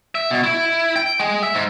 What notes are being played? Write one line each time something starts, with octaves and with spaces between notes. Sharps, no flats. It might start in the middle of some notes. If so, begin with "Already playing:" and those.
E5
B2
E4
G5
G#3
E5
G#2